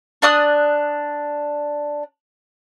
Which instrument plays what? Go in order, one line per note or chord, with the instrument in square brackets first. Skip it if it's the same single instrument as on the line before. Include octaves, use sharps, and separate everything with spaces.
[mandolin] D4 D5 D#6 F#6